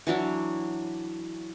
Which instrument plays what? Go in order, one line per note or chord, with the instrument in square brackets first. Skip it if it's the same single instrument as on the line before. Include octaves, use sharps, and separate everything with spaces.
[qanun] E3 F#3 D4 E4